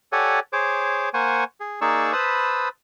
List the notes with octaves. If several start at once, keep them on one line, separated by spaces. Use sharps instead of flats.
G4 A4 C#5 D5 F#5 G#5
G#4 C5 C#5 D6
A#3 C5 F#5 G#5 C#6
G#4
A#3 D#4 G#4 D5 C#6 E6
B4 C5 A5 B5 D#6 E6